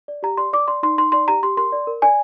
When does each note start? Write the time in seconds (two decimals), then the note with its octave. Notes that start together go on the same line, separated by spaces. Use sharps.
0.08 D5
0.23 G4 A#5
0.37 D5 C6
0.53 D5 D6
0.68 D5 C6
0.83 D#4 C6
0.98 D#4 C6
1.12 D5 C6
1.28 G4 A#5
1.43 G4 C6
1.57 A#4 C6
1.72 D5
1.87 A#4
2.02 D5 G#5